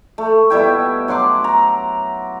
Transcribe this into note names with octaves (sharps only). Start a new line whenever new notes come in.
A3
B2 G3 E4 G5
F#3 F#5 C6 D6
A#5